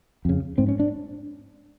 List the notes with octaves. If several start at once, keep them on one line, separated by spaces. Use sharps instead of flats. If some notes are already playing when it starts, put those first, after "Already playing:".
F2 C#3
G#2 C4
C#4
D4